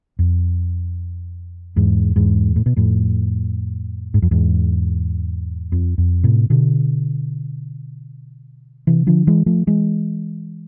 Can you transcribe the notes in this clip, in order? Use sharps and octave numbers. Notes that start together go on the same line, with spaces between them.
F2
E2 G#2
E2 G#2
A2
B2
F2 A2
G#2
F2
E2 G#2
F2
F2
A2 C3
B2 D3
C3 E3
D3 F3
E3 G#3
F3 A3
E3 G#3